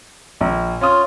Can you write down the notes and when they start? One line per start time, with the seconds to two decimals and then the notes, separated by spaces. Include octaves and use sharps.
0.41 A#1
0.81 C#4 F4 D#6